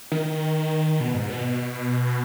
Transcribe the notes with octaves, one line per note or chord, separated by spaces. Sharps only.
D#3
B2
G#2
B2